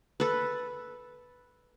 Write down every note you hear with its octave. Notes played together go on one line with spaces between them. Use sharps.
A4 B4